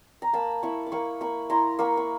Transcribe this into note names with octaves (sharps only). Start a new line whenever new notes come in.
A#5
A#3 A5 B5
E4 B5 C#6
D6
A#3 B5 C#6
A#3 B5 C#6
E4 A#5 C6
A#3 B5 C#6
C#6